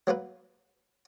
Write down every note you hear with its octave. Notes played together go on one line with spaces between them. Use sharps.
F#3 A#3 A#4 B4